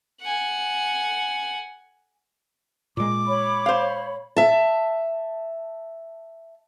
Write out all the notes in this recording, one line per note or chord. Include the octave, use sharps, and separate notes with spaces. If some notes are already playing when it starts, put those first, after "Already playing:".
F#5 G#5
A#2 G#3 D6
C#5 B5
C5 F5
E5 A5